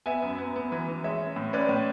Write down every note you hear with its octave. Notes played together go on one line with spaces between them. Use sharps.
B3 E5 G#5
F#2
B3
B3
E3
E3
G#3 C#5 E5
C#4
A2
C#4 B4 D5
A2